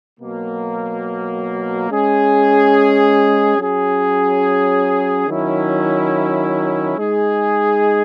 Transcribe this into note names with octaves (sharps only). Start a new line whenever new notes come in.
B2 F#3 A#3
G#3 C#4 G#4
F#3 C#4 G#4
D#3 F#3 C#4 E4
G#3 D#4 G#4